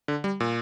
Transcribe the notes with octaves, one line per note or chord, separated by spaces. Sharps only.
D3
G3
A#2